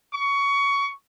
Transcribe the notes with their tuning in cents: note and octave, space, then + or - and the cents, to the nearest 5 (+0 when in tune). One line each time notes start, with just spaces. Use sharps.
C#6 +20